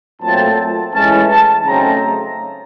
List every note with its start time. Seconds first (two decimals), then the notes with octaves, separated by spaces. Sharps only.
0.22 A#2 F#3 A3 C4 A5
0.94 A2 E3 G#3 C#4 A5
1.30 A5
1.65 C#3 F#3 A3 C4 D#4 A#5